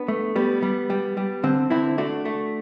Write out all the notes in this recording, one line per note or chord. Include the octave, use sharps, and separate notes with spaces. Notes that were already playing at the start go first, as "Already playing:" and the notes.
Already playing: B3 D4
A3
G3 B3
G3
G3
G3
D3 C4
D3 C4 E4
A3 D4 F#4
A3